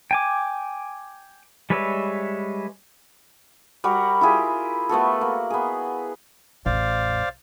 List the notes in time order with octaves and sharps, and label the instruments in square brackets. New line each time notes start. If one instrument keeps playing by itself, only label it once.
[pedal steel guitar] G5 G#5 D6
G3 G#3 B4 C#5 E5
[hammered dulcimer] G3 F#4 A#4 F#5
E4 F4 G4 G#4
A3 B3 F#4 A4
A#3
B3 G#4
[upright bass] A1 E2 [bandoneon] C5 D5 F5